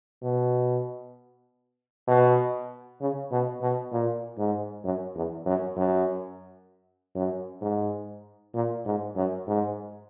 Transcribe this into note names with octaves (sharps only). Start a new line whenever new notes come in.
B2
B2
C#3
B2
B2
A#2
G#2
F#2
E2
F#2
F#2
F#2
G#2
A#2
G#2
F#2
G#2